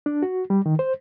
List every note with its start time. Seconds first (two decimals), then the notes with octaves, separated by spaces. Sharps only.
0.06 D4
0.23 F#4
0.50 G3
0.66 D#3
0.79 C5